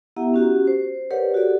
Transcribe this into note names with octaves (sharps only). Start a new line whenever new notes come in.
B3 E4 G4 E5 F#5 A#5
C#4 F#4 G4
C5
G4 A#4 B4 C#5 D5 F#5
F#4 G4 A4 D5